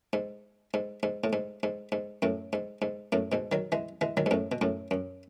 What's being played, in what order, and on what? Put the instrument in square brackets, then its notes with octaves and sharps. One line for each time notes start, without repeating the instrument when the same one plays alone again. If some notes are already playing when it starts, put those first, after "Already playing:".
[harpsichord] G#2
G#2
G#2
A2
G#2
G#2
G#2
F#2 A2
G#2
G#2
F#2 A2
G#2 B2
D#3 F#3
E3 G#3
E3 G#3
D#3 F#3
G#2
F#2 A2
B2
F#2 A2
F#2